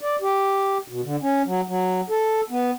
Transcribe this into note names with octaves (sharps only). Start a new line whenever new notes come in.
D5
G4
B2
D3
C#4
F#3
F#3
A4
B3